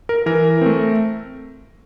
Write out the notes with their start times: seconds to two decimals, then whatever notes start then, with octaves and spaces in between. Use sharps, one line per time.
0.09 A#4
0.26 E3 A#4
0.61 A3 C4